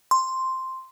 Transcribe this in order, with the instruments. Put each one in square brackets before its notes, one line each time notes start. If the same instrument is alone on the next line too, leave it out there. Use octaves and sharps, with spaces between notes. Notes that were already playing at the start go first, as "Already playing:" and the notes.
[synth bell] C6